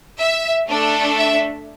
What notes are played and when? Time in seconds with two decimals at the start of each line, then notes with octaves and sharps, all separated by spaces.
0.20 E5
0.69 A3 D4 A4
1.17 E5